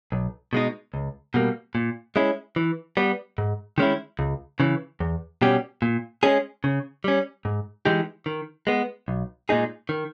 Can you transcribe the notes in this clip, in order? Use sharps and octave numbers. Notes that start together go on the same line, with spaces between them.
B1
B2 G#3 D#4
C#2
B2 G3 A#3
A#2
G#3 C#4 E4
E3
G3 B3
G#2
D#3 G#3 C#4 E4
C#2
C#3 E3
E2
B2 G3 C#4 G4
A#2
G#3 C#4 G#4
C#3
G3 C#4
G#2
E3 G#3 D#4 G4
D#3
G#3 B3
B1
A#2 G#3 D#4 G#4
D#3